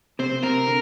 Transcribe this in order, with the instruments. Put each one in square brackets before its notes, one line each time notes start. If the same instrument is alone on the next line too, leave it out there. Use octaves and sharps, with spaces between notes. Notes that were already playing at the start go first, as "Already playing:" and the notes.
[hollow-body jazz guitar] C3 C4 [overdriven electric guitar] C5
[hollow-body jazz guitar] C3 C4 [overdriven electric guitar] A#4
[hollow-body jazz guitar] D3